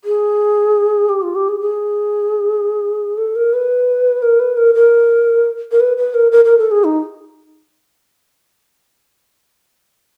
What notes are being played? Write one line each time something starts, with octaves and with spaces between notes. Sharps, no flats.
G#4
G4
F4
G4
G#4
G#4
A4
A#4
B4
A#4
B4
A#4
A#4
A#4
B4
B4
A#4
A#4
A#4
A4
G#4
D#4